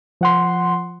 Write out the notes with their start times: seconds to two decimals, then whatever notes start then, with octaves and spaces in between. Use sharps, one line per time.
0.21 F3 F#5 C6